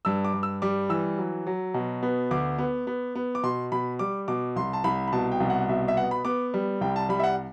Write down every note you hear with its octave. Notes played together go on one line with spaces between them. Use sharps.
G2 E6
D6
G2
E6
G3 D6
E3 E6
F#3
F#3
B2
B3
D2 D6
B3
B3
B3
D6
B2 C6
B2 B5
G3 D6
B2 D6
C2 C6
A5
C2 B5
B5
B2 A5
G5
C2
F#5
B2 E5
E5
B3 F#5
B5
B3 D6
G3
C2 G5
A5
G3 B5
E5
F#5